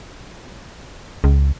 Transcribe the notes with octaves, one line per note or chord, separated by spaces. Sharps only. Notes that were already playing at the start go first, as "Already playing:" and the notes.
C#2